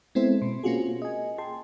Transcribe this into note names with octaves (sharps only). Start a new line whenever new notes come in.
G#3 B3 C4 E4 A4 C5
B2 C6
A#3 C4 C#4 F4 F#4 G#4
D#5 G#5
G#4 G5 A5 C6